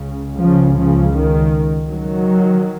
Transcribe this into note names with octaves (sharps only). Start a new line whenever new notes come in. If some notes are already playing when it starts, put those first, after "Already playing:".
Already playing: C#2 C#3
C#3 F3
C#3 F3
D#3
D#3 F#3